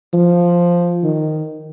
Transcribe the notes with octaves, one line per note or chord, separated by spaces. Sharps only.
F3
D#3